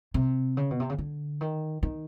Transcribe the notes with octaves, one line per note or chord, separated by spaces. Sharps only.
C3
C#3
B2
C3
C#3
D3
D#3
D#3